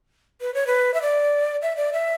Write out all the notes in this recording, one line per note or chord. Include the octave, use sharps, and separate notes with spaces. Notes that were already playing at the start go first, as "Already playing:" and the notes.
B4
C#5
B4
E5
D5
E5
D5
E5